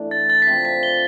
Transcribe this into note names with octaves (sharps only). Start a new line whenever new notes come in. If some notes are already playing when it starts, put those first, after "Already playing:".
Already playing: E3 A3 D4
A6
A6
B6
C3 F3 C4 A6
B6
G7